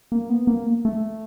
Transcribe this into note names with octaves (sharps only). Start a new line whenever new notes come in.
A#3
B3
A#3
A3